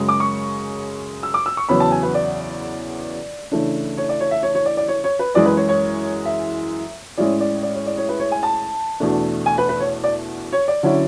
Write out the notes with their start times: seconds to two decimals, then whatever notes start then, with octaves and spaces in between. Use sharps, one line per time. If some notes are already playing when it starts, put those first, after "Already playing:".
Already playing: F#2 C#3 G#3
0.09 D6
0.20 C#6
1.23 E6
1.34 D6
1.46 E6
1.57 C#6
1.69 E2 C#3 F#3 B3 B5
1.80 A5
1.92 G#5
2.03 B4
2.14 D5
3.52 C#3 E3 A3 D4
3.98 C#5
4.09 D5
4.20 C#5
4.31 E5
4.43 C#5
4.55 C#5
4.66 D5
4.77 D5
4.88 C#5
5.04 C#5
5.19 B4
5.35 F#2 E3 G#3 D5
5.46 B4
5.57 C#5
5.69 C#5
6.25 E5
7.18 A2 G#3 C#4 E4 D5
7.41 D5
7.63 D5
7.75 C#5
7.86 D5
7.98 C#5
8.09 B4
8.20 C#5
8.32 G#5
8.43 A5
9.00 E2 B2 A3 D4
9.46 G#5
9.58 B4
9.69 B4
9.80 C#5
10.04 D5
10.53 C#5
10.68 D5
10.83 D3 F#3 C#4 E4